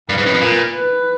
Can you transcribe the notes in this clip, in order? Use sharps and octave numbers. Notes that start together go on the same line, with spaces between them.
G2 B4
G#2
F#2
F2
A#2
B4